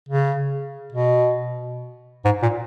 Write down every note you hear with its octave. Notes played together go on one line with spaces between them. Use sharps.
C#3
B2
G#2
A#2